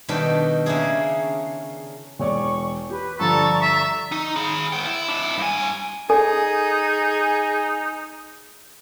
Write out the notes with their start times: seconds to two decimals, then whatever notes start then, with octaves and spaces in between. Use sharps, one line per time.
0.09 B2 D#3 G3 B3 D4 A4
0.66 C#3 A#3 D4 E4 G#4
2.19 E1 C#5 D5 C#6
2.90 G4 B4
3.20 G2 D3 F3 A4 D5 A#5 C#6
3.62 E5
4.12 D#4
4.36 G#4 B5
4.73 B3 G5
4.87 E4
5.08 D4 E4
5.38 G2 G#5
6.10 D#4 G#4 A4 G#5